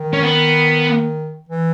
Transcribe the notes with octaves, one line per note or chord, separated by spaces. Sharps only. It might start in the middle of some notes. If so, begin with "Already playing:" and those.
Already playing: D#3
C#4
B3
E3